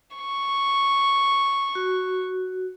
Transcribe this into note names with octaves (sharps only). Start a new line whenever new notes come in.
C#6
F#4